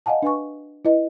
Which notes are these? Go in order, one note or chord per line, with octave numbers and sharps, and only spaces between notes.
D#5 F5 F#5 G#5 A5
D4 B4 G#5 C#6
E4 B4 D#5